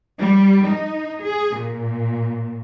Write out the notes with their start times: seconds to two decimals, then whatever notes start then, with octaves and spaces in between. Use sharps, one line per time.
0.19 G3
0.67 D#4
1.21 G#4
1.57 A#2